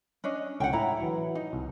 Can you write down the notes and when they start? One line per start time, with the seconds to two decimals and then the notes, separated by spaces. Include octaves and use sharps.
0.24 C#4 D4 D#5
0.60 C#2 D3 C#4 F#5 G5
0.73 A2 E4 A#5
1.00 E3 F#3
1.35 D#4
1.53 C2